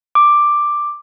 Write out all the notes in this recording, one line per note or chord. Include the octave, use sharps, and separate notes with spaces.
D6